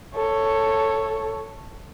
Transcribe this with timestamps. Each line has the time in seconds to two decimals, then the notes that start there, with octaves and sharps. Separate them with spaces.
0.15 A4 C#5